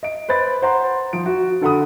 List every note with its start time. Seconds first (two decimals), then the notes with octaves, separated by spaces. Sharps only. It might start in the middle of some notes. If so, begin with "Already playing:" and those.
0.03 D#5 D7
0.28 B4 C5 B5 A6
0.62 C5 F#5 A#5 C6
1.13 F3 D7
1.26 F#4
1.61 D3 A4 F#5 B5 D#6